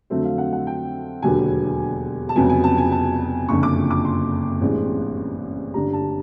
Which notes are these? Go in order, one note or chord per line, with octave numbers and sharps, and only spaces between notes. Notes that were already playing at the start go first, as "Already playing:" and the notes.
F2 D3 F#3 A3 C4 E5
F5
F#5
F#5
G5
E1 D#2 D3 F#3 B3 G#5
A5
F1 F2 C#3 F#3 B3 G#5
G#5
A5
G#5
A5
F#1 F2 D3 C#6
D6
D6
C6
A1 G2 E3 G#3 C4
G1 G2 D3 G3 A#5
A5